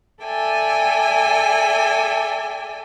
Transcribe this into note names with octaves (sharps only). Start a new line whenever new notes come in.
A4 D5 E5 G5 G#5